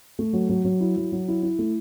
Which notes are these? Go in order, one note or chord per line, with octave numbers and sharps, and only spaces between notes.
A3
F#3
F#3
F#3
E4
F#3
F#3
E4
E4
A3